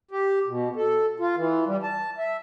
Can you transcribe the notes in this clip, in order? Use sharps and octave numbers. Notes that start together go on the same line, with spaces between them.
G4
B2
A4
F4
E3
G3
A5
E5